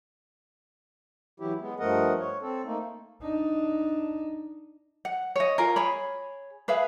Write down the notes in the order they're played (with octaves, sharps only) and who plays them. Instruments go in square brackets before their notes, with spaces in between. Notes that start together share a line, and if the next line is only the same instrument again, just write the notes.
[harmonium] E3 F#3 E4 G4
G#3 B3
G2 F3 A3 A#4 D#5 F#5
C#5
C4 A4
A3 A#3 D#4
[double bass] D4 D#4
[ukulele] F#5
C#5 D#5
F4 G#4 A#4
G#4 C#5 B5
G#4 B4 E5 F5